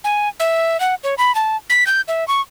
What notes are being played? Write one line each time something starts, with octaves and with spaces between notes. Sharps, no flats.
G#5
E5
F#5
C#5
B5
A5
B6
G6
E5
C#6